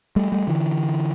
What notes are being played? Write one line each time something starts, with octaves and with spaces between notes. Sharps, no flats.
G3 A3
G3 A3
D3 E3